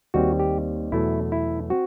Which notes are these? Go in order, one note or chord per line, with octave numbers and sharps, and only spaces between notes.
D#2 D#3 G3 C4 F#4
G4
E2 B2 F#3 A3 E4
E4
C4 F#4